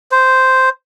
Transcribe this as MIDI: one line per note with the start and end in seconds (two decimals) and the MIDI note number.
0.12 0.69 72